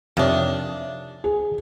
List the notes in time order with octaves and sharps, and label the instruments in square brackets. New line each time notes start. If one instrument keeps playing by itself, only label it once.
[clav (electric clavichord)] F2 C3 [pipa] D#3 D4 [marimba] C#5 E5 F5
[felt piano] G#4